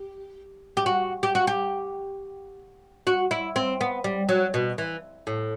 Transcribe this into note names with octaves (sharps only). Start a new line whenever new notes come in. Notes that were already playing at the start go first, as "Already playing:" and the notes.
Already playing: G4
G4
F#4
G4
F#4
G4
F#4
E4
C4
B3
G3
F#3
B2
E3
A2